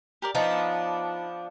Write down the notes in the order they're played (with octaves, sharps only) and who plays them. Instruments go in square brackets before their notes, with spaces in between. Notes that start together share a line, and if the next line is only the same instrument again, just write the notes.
[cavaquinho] G4 A#4 D5
[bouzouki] F3 B3 D4 [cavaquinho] D#4 F4